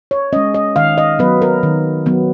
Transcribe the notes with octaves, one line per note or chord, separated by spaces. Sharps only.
C#5
G#3 C#4 D#5
D#5
D#3 F5
D#5
F#3 B3 B4
A#4
D#3
F#3 B3